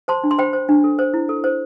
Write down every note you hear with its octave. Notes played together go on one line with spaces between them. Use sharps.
C5 A5 C6
D4
C6
C5 G5 B5
C5
D4
A4
C5
E4
A4
C5